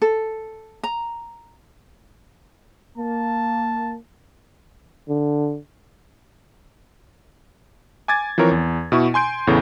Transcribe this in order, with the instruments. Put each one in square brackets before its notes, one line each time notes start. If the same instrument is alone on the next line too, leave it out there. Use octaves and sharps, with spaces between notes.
[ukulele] A4
A#5
[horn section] A#3 [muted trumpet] A5
[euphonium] D3
[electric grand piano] G#5 D6 G#6 A6
E3 F3 C4 A#4 C#5
E2
B2 E4 C#6
G#5 C6 G6 D7
E2 A2 C#3 A3 B3